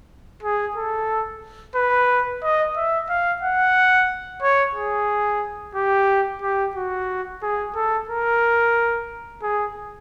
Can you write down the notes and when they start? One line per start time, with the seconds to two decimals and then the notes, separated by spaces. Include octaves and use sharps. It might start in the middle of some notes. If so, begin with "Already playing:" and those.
0.43 G#4
0.75 A4
1.75 B4
2.43 D#5
2.76 E5
3.09 F5
3.42 F#5
4.42 C#5
4.75 G#4
5.75 G4
6.42 G4
6.76 F#4
7.43 G#4
7.76 A4
8.09 A#4
9.42 G#4